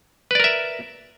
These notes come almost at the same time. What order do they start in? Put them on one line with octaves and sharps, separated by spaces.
B4 D5 A#4 E5